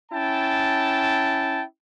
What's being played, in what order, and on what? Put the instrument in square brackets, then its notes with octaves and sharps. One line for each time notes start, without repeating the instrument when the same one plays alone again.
[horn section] C#4 E4 G5 A5